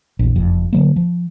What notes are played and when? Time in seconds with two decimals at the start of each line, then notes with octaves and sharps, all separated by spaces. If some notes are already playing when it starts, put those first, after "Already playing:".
0.19 A#1 E2
0.36 F#1 F2
0.73 D3 F#3 A#3
0.96 F3